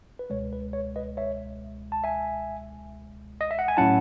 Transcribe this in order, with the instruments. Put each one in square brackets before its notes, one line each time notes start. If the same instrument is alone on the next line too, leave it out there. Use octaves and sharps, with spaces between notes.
[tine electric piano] B4
C#2 B2 G#3 C#5
B4
C#5
B4 D#5
C#5 E5
A5
E5 G#5
D#5
E5
F#5
G#5
A2 F#3 C#4 E4 F#5 A5